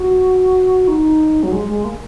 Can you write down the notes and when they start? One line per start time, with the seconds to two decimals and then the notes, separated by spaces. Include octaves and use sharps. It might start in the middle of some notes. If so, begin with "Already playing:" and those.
Already playing: F#4
0.88 D#4
1.43 F#3
1.52 G#3
1.68 G#3
1.85 A#3